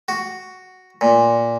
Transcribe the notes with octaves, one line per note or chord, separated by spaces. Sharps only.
F#4
A#2